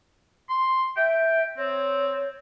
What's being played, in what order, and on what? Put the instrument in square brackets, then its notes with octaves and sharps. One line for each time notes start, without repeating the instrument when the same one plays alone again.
[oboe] C6
[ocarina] E5 [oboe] G5
[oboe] C4 [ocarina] C#5